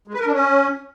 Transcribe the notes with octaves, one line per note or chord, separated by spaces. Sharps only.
G#3
B4
A#4
D4
C#4